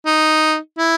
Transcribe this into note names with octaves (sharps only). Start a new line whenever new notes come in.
D#4
E4